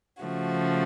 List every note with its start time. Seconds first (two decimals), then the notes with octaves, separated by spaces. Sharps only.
0.23 C#3 F3 A3 F#4